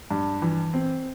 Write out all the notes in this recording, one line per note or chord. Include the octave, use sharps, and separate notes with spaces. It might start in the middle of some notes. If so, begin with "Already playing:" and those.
G2
E3
C4